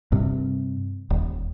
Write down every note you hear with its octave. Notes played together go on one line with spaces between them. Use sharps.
G2 C3
D#1